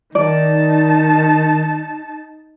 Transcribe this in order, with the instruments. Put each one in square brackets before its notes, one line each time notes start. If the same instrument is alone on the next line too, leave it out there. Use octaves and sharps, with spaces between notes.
[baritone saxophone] D#3 [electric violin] D#4 A5 [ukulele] D5